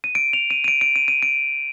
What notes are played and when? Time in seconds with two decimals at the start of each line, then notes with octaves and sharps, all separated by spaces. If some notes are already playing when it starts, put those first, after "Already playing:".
0.04 D#7
0.15 D7
0.33 F7
0.50 D#7
0.64 D#7
0.68 D7
0.81 D7
0.96 D#7
1.08 D#7
1.22 D7